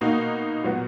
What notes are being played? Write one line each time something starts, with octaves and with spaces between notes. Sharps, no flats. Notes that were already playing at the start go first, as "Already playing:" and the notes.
B2 A#3 D#4 F#4
A#2 F#3 B3 F#4